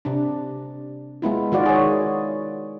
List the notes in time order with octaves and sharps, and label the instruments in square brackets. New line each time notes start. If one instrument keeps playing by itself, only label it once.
[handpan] C3 D4
G#3 B3 E4 F4
D#3 F4 F#4 D5
G#4 C#5